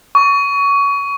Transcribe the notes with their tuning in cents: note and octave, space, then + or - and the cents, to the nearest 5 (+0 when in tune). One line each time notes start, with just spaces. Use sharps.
C#6 +25